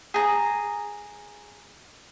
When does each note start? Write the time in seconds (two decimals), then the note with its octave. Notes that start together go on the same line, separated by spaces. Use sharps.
0.14 G#4 A#5